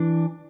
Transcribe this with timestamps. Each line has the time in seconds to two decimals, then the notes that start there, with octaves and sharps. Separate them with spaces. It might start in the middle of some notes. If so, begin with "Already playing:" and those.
Already playing: E3 D4